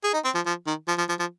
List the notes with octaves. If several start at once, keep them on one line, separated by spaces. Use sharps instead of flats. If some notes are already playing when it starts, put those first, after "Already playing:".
G#4
D#4
C4
F3
F3
D#3
F3
F3
F3
F3